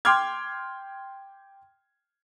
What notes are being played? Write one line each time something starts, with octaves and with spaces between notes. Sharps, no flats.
G5 C6 D6 F6 G#6